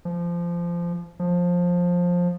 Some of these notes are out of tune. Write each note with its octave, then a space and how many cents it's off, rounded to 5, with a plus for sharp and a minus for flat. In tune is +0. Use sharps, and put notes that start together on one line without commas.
F3 -20
F3 +15